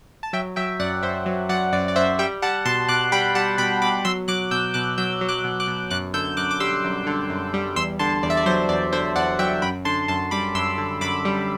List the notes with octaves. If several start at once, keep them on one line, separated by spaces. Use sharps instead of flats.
A5
F#3 E5 G5
F#3 E5 G5
F#2 D5 F#5
F#2 C5 E5
F#3
F#3 D5 F#5
F#2 D5
D5
F#2 C5 E5
G3 E5 G5
G3 F#5 A5
B2 A5 C6
B2 D6 F#6
G3 G5 B5
G3 F#5 A5
B2 G5 B5
B2 B5 D6
F#3 C6 E6
F#3 D6 F#6
B2 E6 G6
B2 D6 F#6
F#3 E6 G6
F#3
D6 F#6
B2
D6 F#6
B2
F#2 D6 F#6
D3 E6 G6
F#2 D6 F#6
D6
G3 C6 E6
F#2
D3
F#2
G3
E2 C6 E6
D3 A5 C6
E2 D5
E5
D5
F#3 C5
E2 D5
D3 C5 E5
E2 D5 F#5
F#3 E5 G5
F#2 G5 B5
D3 A5 C6
F#2 A5 C6
G3 B5 D6
F#2 C6 E6
D3
F#2 B5 D6
G3